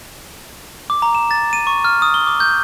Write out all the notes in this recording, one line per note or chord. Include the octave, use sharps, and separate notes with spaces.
D6
A#5
E7
A6
D#7
C#6
F6
D#6
G7
D6
G6